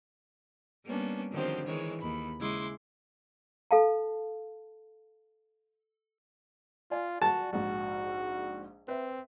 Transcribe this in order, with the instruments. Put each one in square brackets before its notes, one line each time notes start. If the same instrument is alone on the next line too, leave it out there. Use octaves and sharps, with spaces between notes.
[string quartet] G3 A#3 B3 C#4 D4
D3 D#3 F3 F#3 C4 G4
D#3 E3 G#3 C#5
D#2 B5
C#3 G#3 E4 C6 D6
[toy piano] A4 F5 A5
[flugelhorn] F4 [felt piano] D5 G#5
[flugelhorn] F#4 [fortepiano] A5
[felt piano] A#1 G#2 [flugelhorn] F#4
[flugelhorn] C4 [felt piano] B4 E5